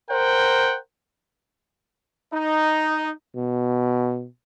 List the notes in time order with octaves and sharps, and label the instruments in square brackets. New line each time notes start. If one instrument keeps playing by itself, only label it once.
[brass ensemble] A#4 C5 F#5 G5
[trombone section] D#4
[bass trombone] B2